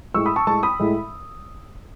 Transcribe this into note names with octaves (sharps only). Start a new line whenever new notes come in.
A2 G#3 C#6 E6
B5 D#6
A5 C#6
A2 G#3 A5 C#6
B5 D#6
A2 G#3